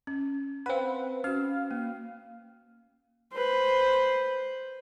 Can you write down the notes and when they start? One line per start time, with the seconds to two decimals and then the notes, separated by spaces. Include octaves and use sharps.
0.07 C#4
0.66 C4 B4 F5 F#5
1.24 C#4 F#4 F5
1.71 A#3
3.33 B4 C5